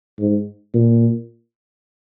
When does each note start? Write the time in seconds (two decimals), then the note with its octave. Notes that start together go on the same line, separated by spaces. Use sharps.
0.19 G#2
0.74 A#2